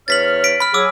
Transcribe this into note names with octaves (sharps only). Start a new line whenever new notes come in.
E2 C#5 F6 A6 B6 F#7
B6 D7
B5 F6
F#3 G#4 D6 E6